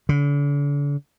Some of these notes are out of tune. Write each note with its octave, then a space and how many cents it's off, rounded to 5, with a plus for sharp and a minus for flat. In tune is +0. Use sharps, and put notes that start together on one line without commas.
D3 -40